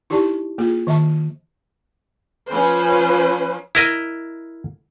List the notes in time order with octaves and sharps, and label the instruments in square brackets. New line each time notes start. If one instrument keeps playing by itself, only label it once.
[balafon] D#4 E4 G4 D5 A5 C#6
A#3 F4 G#4
D#3 D#5 E5 A5 C#6
[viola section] F3 C#4 B4 C5
[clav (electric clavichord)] E4 A#4 D#5